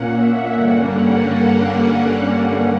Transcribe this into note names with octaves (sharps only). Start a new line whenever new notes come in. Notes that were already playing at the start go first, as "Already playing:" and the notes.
Already playing: A#2 A#3 C#4 F#5
E5
G2 D3 G3 A#3 C#4 F#5